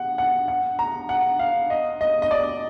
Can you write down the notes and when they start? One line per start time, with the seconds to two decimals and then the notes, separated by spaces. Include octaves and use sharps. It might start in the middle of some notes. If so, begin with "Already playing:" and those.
Already playing: F#5
0.18 F#5
0.48 F#5
0.79 A#5
1.09 F#5
1.39 F5
1.70 D#5
2.01 D#5
2.22 D#5
2.31 D5